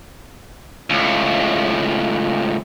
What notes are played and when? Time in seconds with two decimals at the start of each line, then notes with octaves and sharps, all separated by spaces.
0.90 C#2 A2